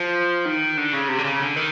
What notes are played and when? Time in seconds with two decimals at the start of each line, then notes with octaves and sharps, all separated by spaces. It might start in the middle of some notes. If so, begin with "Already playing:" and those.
Already playing: F3
0.46 D#3
0.77 D3
0.93 C#3
1.09 C3
1.19 D3
1.24 C#3
1.40 D3
1.56 D#3